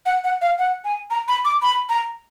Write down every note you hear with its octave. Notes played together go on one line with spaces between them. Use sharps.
F#5
F#5
F5
F#5
G#5
A#5
B5
D6
B5
A#5